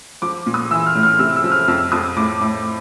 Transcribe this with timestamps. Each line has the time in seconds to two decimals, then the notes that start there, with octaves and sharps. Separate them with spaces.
0.22 F3 D6
0.46 A#2
0.54 D#6
0.71 E3 E6
0.87 F6
0.95 A2
1.03 F6
1.19 C3 E6
1.36 E6
1.44 F3
1.52 F6
1.68 F2 E6
1.92 F2 D#6
2.16 A2 D6
2.41 A2